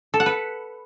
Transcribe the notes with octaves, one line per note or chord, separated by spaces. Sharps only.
A4
F#5
B4